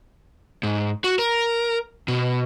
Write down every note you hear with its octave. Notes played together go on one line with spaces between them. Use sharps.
G#2
F#4
A#4
B2